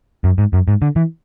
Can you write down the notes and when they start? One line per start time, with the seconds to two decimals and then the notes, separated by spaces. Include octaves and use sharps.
0.24 F#2
0.38 G#2
0.53 F#2
0.68 G#2
0.82 D3
0.96 E3